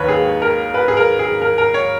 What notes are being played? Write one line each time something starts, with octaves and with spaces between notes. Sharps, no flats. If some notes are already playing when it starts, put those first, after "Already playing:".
Already playing: D#2 D#3 B4 C#5
G#4
A#4
B4
G#4
A#4
G#4
A#4
A#4
C#5